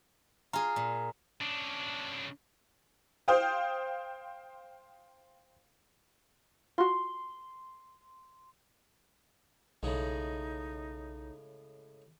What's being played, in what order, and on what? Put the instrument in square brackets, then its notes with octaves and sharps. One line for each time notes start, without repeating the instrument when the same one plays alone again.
[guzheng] F4 G#4 [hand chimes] A#5
[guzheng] A#2
[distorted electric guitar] C#3 D4
[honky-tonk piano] C5 F5 G5 D#6
[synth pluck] F4 F#4 [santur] C6
[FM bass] B1 [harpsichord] A2 C#3 G#3 [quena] D#4